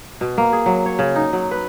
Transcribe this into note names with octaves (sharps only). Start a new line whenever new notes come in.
B2
A#3
G#4
F#3
C#5
C#3
D#4
F#3
B4